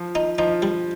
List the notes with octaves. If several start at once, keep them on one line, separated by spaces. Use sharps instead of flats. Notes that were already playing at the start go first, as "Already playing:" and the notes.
Already playing: F3
D#4
F3 D#4
G3